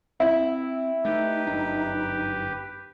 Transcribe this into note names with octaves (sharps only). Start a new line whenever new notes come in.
C4 E4
A3 D#4 G4 B4
G1 F#2 D4